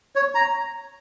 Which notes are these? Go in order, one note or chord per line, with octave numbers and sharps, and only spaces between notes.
C#5
A#5